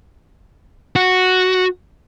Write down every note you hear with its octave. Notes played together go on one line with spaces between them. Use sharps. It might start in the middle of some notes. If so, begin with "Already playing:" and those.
F#4